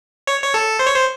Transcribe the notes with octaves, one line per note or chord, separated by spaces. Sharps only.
C#5
C#5
A4
C5
C#5
C5